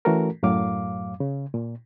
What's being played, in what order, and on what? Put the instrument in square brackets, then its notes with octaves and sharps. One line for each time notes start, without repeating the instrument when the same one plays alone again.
[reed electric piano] E3 A3 C#4 F#4 A4 A#4
F#2 A2 F#3 F5 D6
C#3
A#2